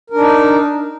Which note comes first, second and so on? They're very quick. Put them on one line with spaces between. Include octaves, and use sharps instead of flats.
A#4 D4 D#4